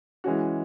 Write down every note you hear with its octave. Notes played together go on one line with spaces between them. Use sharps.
E3 G#3 C#4 F#4